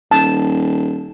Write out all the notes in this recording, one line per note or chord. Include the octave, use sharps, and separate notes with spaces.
D#1 A5